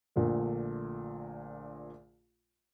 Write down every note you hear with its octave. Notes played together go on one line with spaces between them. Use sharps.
A#1 A#2 D3 A3